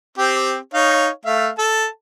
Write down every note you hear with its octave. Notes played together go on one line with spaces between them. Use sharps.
C4 G4
D#4 C#5 F5
A3 E5 F5
A4 A5